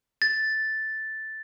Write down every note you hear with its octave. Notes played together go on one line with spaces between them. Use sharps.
A6